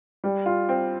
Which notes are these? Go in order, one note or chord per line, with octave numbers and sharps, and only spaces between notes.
G3
F4
C4